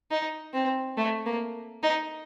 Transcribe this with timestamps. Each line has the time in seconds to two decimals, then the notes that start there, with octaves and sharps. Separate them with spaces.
0.11 D#4
0.53 C4
0.97 A3
1.26 A#3
1.83 D#4